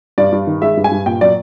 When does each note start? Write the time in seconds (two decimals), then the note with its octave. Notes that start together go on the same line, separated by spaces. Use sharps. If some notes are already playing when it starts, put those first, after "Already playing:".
0.18 G2 D5
0.32 G2
0.47 D#3
0.62 G#3 E5
0.77 G2
0.84 G#5
0.91 G2
1.06 A#2 G5
1.21 F#3 D5